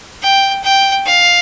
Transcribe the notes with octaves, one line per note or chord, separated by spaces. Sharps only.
G5
G5
F5